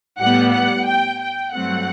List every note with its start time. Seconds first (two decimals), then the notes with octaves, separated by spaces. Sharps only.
0.19 A2 G3 B3 F#5
0.52 F#5
0.86 G5
1.20 G5
1.54 G2 F#3 A3 C4 F#5